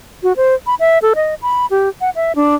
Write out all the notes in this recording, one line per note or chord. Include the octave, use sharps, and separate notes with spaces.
F#4
C5
B5
E5
A4
D#5
B5
G4
F#5
E5
D4